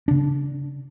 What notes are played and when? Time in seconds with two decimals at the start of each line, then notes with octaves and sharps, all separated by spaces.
0.08 C#3 D4